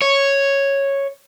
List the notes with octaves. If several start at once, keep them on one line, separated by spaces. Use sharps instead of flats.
C#5